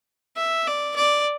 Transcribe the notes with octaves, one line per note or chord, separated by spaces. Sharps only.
E5
D5
D5